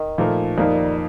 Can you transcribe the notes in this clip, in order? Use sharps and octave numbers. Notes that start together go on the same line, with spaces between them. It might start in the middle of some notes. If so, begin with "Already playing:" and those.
Already playing: D#3
A#2 F3 A3 D#4 A#4
F2 D#3 G3 A#3 D#4 A#4